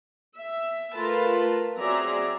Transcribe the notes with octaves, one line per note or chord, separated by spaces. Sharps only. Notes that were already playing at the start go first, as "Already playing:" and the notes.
E5
A3 F4 A#4 B4 A5
F#3 C4 G#4 D5 E5 A#5